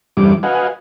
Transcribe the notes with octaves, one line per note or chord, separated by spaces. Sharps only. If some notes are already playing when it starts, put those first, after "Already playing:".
E2 G2 G3 E4 D6
F#4 B4 D#5 F5 F#5 G#5